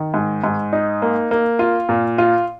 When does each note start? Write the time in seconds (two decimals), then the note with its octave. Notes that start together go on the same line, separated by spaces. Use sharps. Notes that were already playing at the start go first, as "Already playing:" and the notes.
Already playing: D#3
0.14 G#2
0.44 G#2
0.73 D#4
1.02 A#3
1.31 A#3
1.59 F4
1.89 A#2
2.18 F4